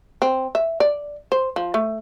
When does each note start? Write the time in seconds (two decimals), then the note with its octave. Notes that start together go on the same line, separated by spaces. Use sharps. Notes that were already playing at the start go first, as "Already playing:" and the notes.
0.22 C4
0.55 E5
0.80 D5
1.32 C5
1.56 F3
1.74 A3